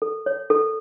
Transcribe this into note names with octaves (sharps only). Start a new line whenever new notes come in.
A4
C#5
A4